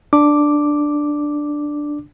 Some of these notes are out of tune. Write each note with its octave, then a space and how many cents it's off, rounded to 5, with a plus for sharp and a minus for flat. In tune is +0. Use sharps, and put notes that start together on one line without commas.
D4 +5 D6 +0